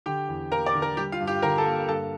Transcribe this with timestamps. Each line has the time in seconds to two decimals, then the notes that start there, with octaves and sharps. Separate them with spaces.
0.06 D3 G4 G5
0.28 E2
0.51 A#3 A#4 A#5
0.66 D5 D6
0.75 D3
0.82 A#4 A#5
0.97 G3 G4 G5
1.12 F4 F5
1.20 G2
1.27 G4 G5
1.42 D3 A#4 A#5
1.58 A4 A5
1.66 A#3
1.88 G2 A4 A5